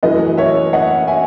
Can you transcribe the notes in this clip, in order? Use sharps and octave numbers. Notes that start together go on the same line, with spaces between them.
F#2 E3 A3 B4 D#5
C#5 E5
D#5 F#5
E5 G#5